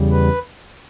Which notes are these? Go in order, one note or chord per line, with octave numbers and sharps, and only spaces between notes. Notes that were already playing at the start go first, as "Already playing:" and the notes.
Already playing: E2 C#3 G3
B4